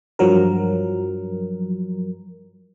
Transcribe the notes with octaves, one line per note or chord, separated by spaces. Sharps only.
G2 F3 F#3 A#4